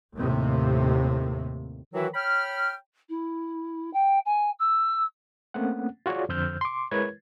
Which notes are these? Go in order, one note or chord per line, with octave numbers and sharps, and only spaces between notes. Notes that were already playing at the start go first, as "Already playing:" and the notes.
D#2 A2 C3
D#3 E3 F#3 E4 F#4
C#5 G5 B5 F6
E4
G5
G#5
E6
A3 A#3 C4 C#4 F#5
F4 F#4 G#4 C#5 D5
F2 D3 C5 E6 F6 G6
C6 D6
G#3 E4 A#4 B4 C#5 G#6